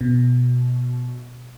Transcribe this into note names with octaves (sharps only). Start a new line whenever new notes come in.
B2